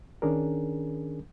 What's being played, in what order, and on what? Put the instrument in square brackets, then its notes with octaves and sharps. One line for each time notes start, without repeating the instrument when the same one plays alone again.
[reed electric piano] D#3 C#4 D4 G#4 A#4